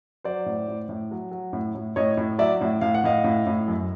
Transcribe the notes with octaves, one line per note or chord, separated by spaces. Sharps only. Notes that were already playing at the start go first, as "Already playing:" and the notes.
F#3 C5 D5
A2
A2
A2
F#3
F#3
A2
A2
A2 C#5 D#5
A2
F#3 D5 E5
A2
A2 F5
F#5
A2 D#5 F5
A2
A2
F#2